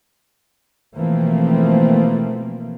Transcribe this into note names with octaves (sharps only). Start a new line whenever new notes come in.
B2 E3 F3 A3 A#3 C4